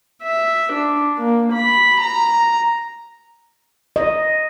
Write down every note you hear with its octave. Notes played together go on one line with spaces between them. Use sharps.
E5
D4
A#3
B5
A#5
D#5